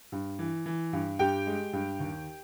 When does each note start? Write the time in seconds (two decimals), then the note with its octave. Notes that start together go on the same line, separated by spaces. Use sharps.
0.12 G2
0.39 E3
0.66 E3
0.93 G2
1.19 G2 G4 G5
1.47 G#3
1.73 G2
2.00 D#2